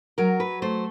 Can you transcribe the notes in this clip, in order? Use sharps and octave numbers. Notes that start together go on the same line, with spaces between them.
F#3 A#4
B4
A3 C5